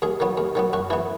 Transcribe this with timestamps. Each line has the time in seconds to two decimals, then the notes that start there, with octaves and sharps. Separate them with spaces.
0.02 D#2 G#4
0.20 D#3 F#3 B3
0.38 D#2
0.55 D#3 F#3 B3
0.73 F#2 F#4
0.90 E3 B3 E4